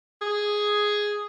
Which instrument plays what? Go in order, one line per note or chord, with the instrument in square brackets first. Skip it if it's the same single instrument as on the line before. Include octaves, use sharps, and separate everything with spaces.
[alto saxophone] G#4